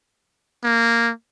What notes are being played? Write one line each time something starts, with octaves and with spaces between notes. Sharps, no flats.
A#3